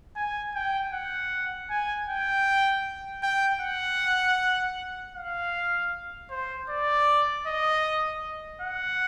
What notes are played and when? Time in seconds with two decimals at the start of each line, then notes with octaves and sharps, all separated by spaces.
0.16 G#5
0.55 G5
0.94 F#5
1.70 G#5
2.09 G5
3.23 G5
3.62 F#5
5.15 F5
6.30 C5
6.70 D5
7.47 D#5
8.62 F#5